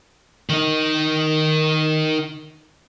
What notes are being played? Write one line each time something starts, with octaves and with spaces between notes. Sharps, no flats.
D#3 D#4